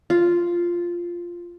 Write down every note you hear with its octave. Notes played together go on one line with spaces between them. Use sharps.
F4